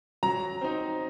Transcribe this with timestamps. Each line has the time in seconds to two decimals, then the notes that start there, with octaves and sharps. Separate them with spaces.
0.23 F#3 A#5
0.61 C4 D#4